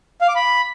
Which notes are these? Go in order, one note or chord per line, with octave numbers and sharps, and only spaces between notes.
F5
D6
B5